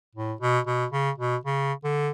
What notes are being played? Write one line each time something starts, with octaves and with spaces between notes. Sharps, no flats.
A2
B2
B2
C#3
B2
C#3
D3